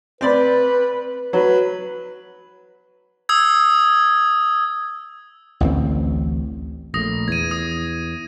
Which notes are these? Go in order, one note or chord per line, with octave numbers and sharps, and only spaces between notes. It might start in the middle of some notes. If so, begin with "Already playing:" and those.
C4 B4 D5 B5
F#3 B4
D#6 E6 G#6
A1 D2 E3 C4
A#1 A3 D#6 A#6
E2 G#6 D#7
D#6